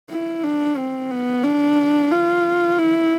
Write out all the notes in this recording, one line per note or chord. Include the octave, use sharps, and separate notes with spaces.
E4
D4
C4
B3
D4
F4
E4